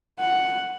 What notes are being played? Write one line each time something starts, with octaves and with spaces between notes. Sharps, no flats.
F#5